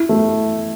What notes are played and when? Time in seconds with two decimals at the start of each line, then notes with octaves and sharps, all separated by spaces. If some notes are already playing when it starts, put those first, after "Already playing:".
Already playing: E4
0.09 A3